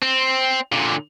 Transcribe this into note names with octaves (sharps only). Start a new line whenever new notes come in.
C4
A#2 D3